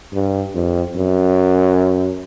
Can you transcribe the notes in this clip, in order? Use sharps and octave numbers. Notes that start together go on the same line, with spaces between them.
G2
F2
F#2